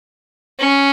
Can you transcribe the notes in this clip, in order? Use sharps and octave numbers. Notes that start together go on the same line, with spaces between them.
C#4